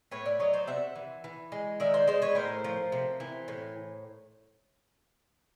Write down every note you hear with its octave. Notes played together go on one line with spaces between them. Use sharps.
A2 B4 C#5
D5 E5
F#3 C#5 D#5
C5 D5
C3 E5 F#5
E3
E3
G#3
D#3 D5 E5
C5 D5
G#3 C5 D5
B4 C#5
A2 A#4 C5
F3
C3
E3
A2